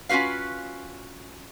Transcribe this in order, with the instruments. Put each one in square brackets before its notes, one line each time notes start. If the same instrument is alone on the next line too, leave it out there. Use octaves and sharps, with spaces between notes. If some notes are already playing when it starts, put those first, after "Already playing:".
[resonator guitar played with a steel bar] C#4 F4 F#4 B4 F5